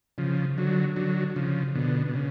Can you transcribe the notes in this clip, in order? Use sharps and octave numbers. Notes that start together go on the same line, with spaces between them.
C#3 F3
D3 F#3
D3 F#3
C#3 F3
B2 D3
B2
C#3